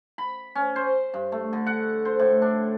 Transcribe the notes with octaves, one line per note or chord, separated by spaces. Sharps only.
B5
C#4
C5
G2
A3
D3
F#5
C5
A2
D4